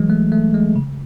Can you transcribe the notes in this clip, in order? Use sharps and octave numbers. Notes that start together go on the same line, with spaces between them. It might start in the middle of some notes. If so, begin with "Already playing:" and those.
Already playing: E3 F#3 G#3
A3
A3
G#3
C#3